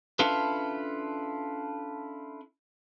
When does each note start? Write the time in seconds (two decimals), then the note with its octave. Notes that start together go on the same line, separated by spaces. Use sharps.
0.19 C#4 D4 E4 F4 A4 B4